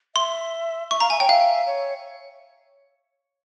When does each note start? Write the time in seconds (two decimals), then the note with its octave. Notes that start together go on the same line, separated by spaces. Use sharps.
0.15 E5 C6
0.91 E5 C#6
1.00 F5 A#5
1.10 E5 G#5
1.20 C#5 G5
1.29 E5 F5
1.67 C#5